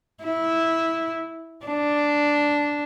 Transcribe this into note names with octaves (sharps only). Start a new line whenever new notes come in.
E4
D4